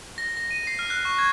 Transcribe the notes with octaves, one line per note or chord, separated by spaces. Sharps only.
A#6
A#6
D#7
C7
F6
F#6
C#6
G#6